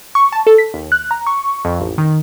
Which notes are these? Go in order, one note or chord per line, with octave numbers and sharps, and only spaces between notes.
C#6
A5
A4
B6
D#2
F#6
A#5
C#6
F2
A1
D#3